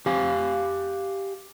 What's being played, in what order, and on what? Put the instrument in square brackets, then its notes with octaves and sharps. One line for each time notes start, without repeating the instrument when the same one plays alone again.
[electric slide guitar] G4 F5 G#5